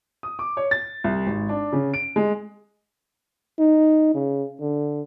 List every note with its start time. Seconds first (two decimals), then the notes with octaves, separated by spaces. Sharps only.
0.23 D#6
0.39 D6
0.57 C#5
0.71 A6
1.04 C2
1.27 G#1
1.49 D4
1.72 C#3
1.94 D7
2.16 G#3
3.59 D#4
4.14 C#3
4.60 D3